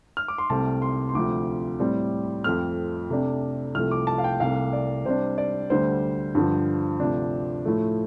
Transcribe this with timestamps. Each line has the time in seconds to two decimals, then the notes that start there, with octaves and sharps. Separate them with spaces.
0.17 F6
0.28 D6
0.38 C6
0.50 C2 C3 A3 C4 A5
0.82 C6
1.09 C6
1.14 D2 C3 F3 C4 D6
1.80 A2 G3 C4
2.44 F2 F3 A3 C4 F6
3.10 C3 A3 D4
3.75 C2 C3 F3 A3 F6
3.91 D6
4.07 A5
4.18 F5
4.24 G5
4.40 C2 C3 A3 F5
4.73 D5
5.05 C3 G3 D4 C5
5.38 D5
5.70 D2 D3 G3 C5
6.35 G2 D3 F3
7.00 D2 C3 F3 D4
7.65 A2 F3 A3